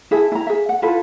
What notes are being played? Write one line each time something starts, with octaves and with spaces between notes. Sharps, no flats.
E4 G#4 E5 A5
E4 A#5
G#4 E5
F#5
E4 F4 A4 B4